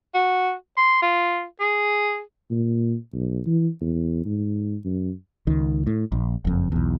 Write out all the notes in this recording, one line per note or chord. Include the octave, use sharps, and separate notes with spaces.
F#4
C6
F4
G#4
A#2
B1
E3
E2
G#2
F#2
C#2 D#3
A2
A#1
F#1 F2
B1 E2